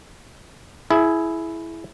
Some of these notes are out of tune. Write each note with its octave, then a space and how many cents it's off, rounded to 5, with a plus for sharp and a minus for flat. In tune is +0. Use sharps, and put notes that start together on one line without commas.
E4 +0 G#4 +25